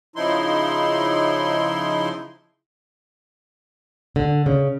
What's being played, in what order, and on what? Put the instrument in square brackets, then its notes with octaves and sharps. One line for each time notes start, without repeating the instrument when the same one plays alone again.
[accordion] C#3 F3 D#4 E4 C6
[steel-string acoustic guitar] D3
C#3